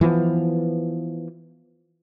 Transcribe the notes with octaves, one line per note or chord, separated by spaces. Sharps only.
E3 F3 G#3 B3